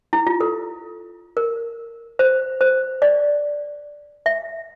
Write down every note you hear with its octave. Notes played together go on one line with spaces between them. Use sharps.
E4
F4
A4
A#4
C5
C5
D5
E5